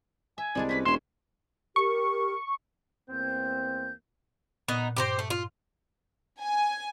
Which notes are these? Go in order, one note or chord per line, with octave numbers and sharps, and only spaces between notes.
E5 G#5
C2 G3 G#3 D4
C4 C#4 B4 B6
E1 C#4 E5 C6 E7
G4 A#4 C#6
E2 A#3 C4 G6
A#2 B3 D#4
G2 G4 B4 C5 A#6
A3
F4
G#5